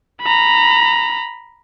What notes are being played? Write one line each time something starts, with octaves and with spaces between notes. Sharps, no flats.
A#5 B5